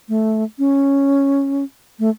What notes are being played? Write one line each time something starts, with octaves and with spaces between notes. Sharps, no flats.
A3
C#4
A3